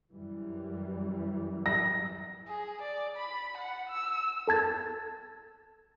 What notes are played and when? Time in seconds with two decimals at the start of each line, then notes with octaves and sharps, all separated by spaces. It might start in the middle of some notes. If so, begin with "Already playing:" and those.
0.12 F#2 E3 G3
1.66 A#6
2.48 G#4
2.82 D5
3.17 B5
3.58 F#5
3.90 E6
4.48 A4 A5 G#6 A6